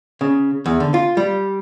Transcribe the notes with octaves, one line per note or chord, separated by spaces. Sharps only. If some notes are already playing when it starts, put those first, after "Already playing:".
C#3
E2
D3
F4
G3